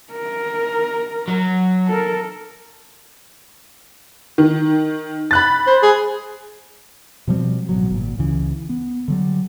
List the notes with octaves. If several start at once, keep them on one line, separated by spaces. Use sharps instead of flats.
A#4
F#3
A4 A#4
D#3
B5 F#6 A6
C5
G#4
B2 F3 G3 C4
A1 B2 F#3
G#1 A#2
C#2 C#3 E3
B3
D3 F#3 G3